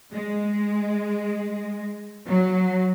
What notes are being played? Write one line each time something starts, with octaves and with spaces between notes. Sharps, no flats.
G#3
F#3